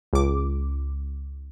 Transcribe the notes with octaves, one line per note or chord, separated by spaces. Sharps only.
C#2 D6